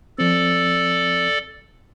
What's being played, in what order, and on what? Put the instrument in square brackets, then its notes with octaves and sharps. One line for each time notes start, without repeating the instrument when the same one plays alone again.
[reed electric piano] F3 C4 [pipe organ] A4 D5